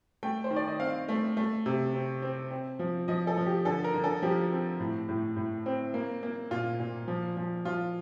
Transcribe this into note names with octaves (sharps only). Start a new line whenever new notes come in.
A3 G5
C5
D#3
D5
D#5
C4 F5
A3
A3
C3
C4
C4
C4
F3
F3 D#5
A4
F3
G4
D3 A4
A#4
D3
A4
F3 G4
C4
A2
A2
A2
C4
A#3
A#3
A#2 F4
A#2
F3
F3
F3 F4